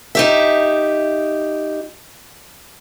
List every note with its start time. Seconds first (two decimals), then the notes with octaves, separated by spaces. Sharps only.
0.15 D#4 G4 E5